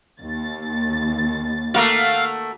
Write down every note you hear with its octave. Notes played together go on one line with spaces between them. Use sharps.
D#2 A6
A3 A#3 F#4 F5